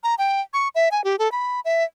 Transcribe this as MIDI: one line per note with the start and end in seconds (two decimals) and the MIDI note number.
0.04 0.15 82
0.18 0.41 79
0.53 0.68 85
0.75 0.89 76
0.91 1.04 80
1.04 1.16 67
1.19 1.31 69
1.32 1.60 83
1.65 1.84 76